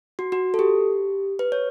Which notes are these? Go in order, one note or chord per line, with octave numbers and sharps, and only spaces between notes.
F#4
F#4
A4
G4
B4
C#5